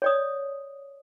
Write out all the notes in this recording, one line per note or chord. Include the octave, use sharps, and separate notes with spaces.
C#5 D5 D#6